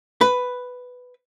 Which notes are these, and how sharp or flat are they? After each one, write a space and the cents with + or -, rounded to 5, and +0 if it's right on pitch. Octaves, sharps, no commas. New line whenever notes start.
B4 +5